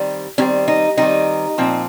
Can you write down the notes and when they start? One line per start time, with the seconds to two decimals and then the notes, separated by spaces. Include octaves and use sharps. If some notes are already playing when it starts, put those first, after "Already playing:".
Already playing: D#3 G3 C4
0.38 D#3 G3 C4 C#4
0.68 D#4
0.97 D#3 G3 C4 D#4
1.58 A#2 F3 C4